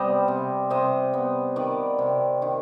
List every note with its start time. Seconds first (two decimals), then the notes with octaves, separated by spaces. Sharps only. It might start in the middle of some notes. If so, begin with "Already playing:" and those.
Already playing: C3 G3 B3 C5 D#5 G5
0.28 C3
0.70 C3 C5 D#5
1.14 B3
1.56 D#3 B4 D5
1.99 C3
2.42 D#3